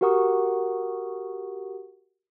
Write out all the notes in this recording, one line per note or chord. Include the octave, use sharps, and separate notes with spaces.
F#4 G4 A#4 F#5 C#6 D#6